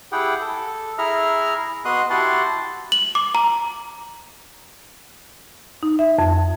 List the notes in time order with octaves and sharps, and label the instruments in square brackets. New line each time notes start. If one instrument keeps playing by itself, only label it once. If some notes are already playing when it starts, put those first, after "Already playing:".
[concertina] E4 G4 G#4 F#5 G5
A4
E4 G#4 E5 A#5 F6
B3 F#4 D#5 C6 D#6 F#6
E4 F#4 G4 F#5 A5 C6
[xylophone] F#7
D6
A#5
[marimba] D#4
E5
F2